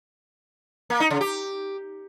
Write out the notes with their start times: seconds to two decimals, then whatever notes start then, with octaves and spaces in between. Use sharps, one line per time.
0.90 A#3
1.00 D#4
1.10 C#3
1.21 G4